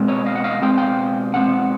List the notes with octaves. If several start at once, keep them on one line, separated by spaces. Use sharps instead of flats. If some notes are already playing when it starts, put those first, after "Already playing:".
Already playing: B2 G#3 C4
C#5 D#5
D#5 F5
F#5
D#5 F5
B2 G#3 C4 G5
F5 G5
B2 G#3 C4 F#5